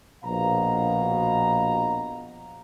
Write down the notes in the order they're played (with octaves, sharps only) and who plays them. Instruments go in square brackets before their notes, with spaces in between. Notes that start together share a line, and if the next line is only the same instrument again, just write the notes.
[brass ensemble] A#1 B2 F5 A#5